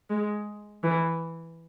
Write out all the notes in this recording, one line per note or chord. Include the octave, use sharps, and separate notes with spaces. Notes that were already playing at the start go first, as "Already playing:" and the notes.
G#3
E3